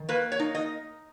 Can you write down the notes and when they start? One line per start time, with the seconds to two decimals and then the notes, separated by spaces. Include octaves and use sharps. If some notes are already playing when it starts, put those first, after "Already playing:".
Already playing: D#3
0.09 A#3 B4
0.32 C#5
0.39 D#4
0.55 D#5